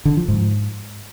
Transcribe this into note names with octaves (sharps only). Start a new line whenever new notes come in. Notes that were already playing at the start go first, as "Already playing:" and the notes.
D3
F3
G#2